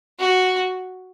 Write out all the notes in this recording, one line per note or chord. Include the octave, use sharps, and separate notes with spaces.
F#4